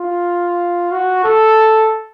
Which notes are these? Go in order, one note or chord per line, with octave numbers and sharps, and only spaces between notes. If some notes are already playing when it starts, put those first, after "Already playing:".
Already playing: F4
F#4
A4